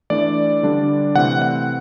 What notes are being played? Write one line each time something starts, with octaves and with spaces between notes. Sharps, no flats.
E3 A3 D4 D5
D3 G3 D4
C3 E3 A3 C4 F#5
F#5